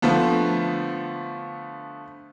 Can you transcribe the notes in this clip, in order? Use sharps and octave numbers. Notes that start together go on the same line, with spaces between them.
D3 F3 A3 B3